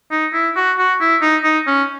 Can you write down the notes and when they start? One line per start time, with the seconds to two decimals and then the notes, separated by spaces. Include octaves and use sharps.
0.11 D#4
0.33 E4
0.56 F#4
0.78 F#4
1.01 E4
1.22 D#4
1.44 D#4
1.67 C#4